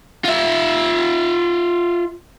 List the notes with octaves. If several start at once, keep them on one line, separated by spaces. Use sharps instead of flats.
F4 E5